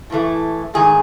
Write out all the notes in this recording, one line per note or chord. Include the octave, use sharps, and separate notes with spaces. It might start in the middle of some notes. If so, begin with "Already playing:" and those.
A2 E3 A3
G#2 D#3 A3 G#4